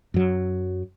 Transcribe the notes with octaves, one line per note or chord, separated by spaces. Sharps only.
F#2 F#3